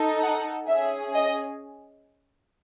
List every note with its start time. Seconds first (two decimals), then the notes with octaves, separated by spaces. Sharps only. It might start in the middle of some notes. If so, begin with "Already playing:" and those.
Already playing: D#4 A4
0.23 F#5
0.68 C#4 G#4 E5
1.15 D#5